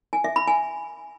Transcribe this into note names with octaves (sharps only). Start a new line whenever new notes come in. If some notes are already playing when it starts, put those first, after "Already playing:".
G#5
E5
B5
G#5